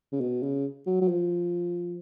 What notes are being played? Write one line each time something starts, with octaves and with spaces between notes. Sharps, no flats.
C#3
B2
C#3
F#3
F#3
F3